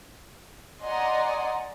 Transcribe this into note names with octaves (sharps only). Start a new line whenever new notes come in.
D5 D#5 F#5 G#5 A#5 C6